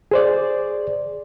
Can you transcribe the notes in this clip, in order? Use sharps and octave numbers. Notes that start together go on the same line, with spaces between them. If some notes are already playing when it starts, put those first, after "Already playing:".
G#4 C5 D5